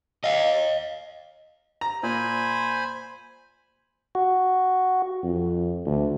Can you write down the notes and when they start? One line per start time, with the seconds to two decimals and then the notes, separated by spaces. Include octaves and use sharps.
0.24 D#5 F5
1.81 A#5
2.03 A#2 C5 G#5 B5
4.15 F#4
5.23 F2
5.86 D2